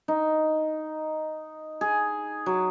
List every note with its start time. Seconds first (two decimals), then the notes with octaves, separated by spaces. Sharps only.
0.08 D#4
1.81 G#4
2.46 F#3